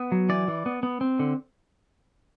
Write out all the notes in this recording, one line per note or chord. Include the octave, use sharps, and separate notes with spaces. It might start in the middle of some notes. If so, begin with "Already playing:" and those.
Already playing: B3
F#3
E3 D5
E3
B3
B3
C4
D3